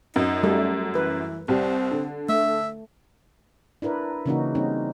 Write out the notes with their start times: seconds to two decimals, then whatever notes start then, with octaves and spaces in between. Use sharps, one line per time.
0.16 F#2 D#4
0.43 G3 A3 A4
0.95 E3 B4
1.48 C2 G3 C4
1.91 D3
2.29 A3 E5
3.82 D4 E4 A#4 B4
4.26 C#3 E3 A#3 C#4 D#4 F#4
4.55 G3 A#3 C4 C#4 D#4